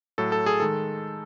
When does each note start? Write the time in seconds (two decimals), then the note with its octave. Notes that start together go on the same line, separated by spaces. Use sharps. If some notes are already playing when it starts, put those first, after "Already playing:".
0.18 A2 F#3 A4
0.32 A4
0.46 G#4
0.60 D#3 G#3 A4